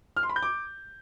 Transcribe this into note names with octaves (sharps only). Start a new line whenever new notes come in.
F6
C6
B5
G6
D6